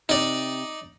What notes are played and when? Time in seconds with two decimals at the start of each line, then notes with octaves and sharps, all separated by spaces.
0.09 C3 D#4 D5